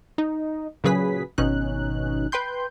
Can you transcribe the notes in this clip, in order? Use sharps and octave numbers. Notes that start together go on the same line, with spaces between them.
D#4
A#2 C#3 F#3 G#4 B4 B6
G#1 B2 C#4 D#4 F#6
B4 G5 C6 G6